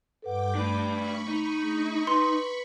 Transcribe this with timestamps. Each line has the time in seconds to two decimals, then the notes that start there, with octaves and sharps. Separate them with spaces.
0.22 G2 A4 B4 F#5 G5 D6
0.55 A3 D4 B4
0.86 B5 C#6
1.28 D#4
1.62 A3 D4 G#4
2.07 B4 C6